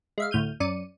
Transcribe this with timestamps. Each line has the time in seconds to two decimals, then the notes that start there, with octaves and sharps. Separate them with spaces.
0.18 G#3 E5 F5
0.31 D2 A2 F6 G6 D#7
0.60 F#2 D5 C#7 D#7